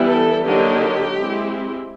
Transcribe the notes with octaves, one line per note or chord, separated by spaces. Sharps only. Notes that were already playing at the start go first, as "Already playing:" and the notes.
Already playing: E3 G3 B3 E4
A4
D3 F#3 A#3 D#4 G4
G#3 C4 E4